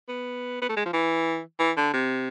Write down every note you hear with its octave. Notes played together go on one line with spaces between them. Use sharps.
B3
B3
A3
G#3
F3
E3
E3
D3
C3